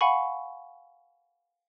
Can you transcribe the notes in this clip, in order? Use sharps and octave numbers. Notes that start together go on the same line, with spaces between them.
F5 F#5 G#5 B5 C#6